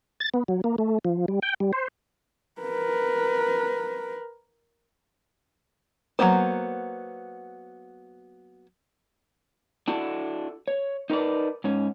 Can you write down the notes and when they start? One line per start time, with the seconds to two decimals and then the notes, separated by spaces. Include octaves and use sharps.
0.20 A6
0.34 B3
0.48 F#3
0.64 A#3
0.78 A3
1.05 F3
1.28 G3
1.42 G5
1.60 G3
1.73 C5
2.61 A#4 B4
6.19 F#3 G#3 A#3 B3 C5
9.88 D4 E4 F#4 A4
10.68 C#5
11.10 D#4 A#4 B4 D5
11.64 G#2 C#4